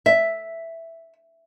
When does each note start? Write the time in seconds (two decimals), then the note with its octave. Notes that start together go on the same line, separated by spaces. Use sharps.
0.06 E5